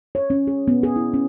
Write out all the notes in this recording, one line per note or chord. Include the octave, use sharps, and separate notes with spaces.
C#5
C#4
G#4
B3
G#4
E4
C#4